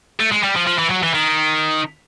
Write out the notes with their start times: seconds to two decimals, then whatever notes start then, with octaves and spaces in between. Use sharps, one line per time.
0.20 A3
0.32 G#3
0.44 G3
0.56 F3
0.67 F3
0.79 E3
0.90 F#3
1.03 E3
1.14 D#3